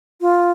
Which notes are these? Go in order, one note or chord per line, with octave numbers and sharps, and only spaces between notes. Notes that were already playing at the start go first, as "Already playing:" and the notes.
F4